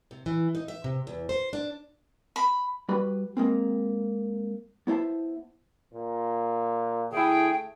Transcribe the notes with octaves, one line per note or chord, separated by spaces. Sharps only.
C3
E3
D#4
E5
C3
E2
C5
D4
B5
G3 F#4 B4 B5
G#3 A#3 C4
B3 E4 C5 E5 A5
A#2
D3 A3 E4 G#4 G5